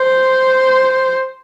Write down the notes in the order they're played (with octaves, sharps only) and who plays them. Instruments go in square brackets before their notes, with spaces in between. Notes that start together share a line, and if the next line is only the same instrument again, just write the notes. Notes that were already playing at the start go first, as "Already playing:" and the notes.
Already playing: [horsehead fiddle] C5